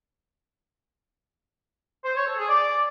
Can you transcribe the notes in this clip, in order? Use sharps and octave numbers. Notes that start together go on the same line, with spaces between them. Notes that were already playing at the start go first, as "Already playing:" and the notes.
C5
C#5
A4
G#4
D5